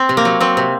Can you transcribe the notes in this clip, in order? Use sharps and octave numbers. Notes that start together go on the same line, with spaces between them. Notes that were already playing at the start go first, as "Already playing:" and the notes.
Already playing: C4
C3
A#3
F#3
F#3 C4
C3